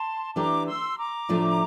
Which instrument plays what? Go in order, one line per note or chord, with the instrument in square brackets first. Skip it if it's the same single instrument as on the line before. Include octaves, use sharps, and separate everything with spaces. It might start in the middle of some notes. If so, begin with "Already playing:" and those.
Already playing: [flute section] A5 C6
[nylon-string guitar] E3 A3 D4 G4 [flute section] A#5 D6
[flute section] C6 E6
A#5 D6
[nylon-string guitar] A2 F3 A3 D4